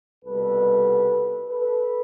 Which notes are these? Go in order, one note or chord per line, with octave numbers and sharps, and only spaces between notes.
C2 B2 G3 A4 B4
A4 B4